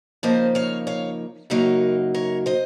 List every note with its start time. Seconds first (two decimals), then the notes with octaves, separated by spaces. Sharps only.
0.23 C#3 F3 A#3 D#4 C5 D#5
0.55 C#5 F5
0.87 C#5 F5
1.50 F#2 C#3 F#3 A#3 D#4 A#4 C#5
2.14 A#4 C#5
2.46 C5 D#5